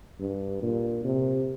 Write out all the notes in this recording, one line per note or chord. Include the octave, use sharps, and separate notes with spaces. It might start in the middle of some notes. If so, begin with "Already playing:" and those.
G2
A#2
C3